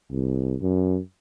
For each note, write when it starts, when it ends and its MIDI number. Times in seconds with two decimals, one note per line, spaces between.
0.11 0.56 36
0.62 0.99 42